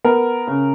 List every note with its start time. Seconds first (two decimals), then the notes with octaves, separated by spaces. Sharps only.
0.04 B3 A#4
0.47 C#3